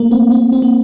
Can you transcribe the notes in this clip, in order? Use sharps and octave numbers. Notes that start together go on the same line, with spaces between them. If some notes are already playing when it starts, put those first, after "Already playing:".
Already playing: A3 A#3
C4
C4
C4
A#3